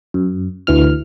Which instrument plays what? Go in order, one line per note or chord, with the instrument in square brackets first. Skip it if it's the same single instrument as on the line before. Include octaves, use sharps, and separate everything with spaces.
[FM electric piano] F#2
D2 E3 F6